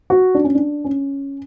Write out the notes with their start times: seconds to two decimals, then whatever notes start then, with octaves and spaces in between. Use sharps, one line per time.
0.10 F#4
0.35 D4
0.44 C#4
0.55 D4
0.84 C#4